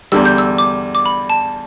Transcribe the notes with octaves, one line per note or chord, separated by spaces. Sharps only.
E2 D3 G3 E6
G6
E6
D6
D6
B5
A5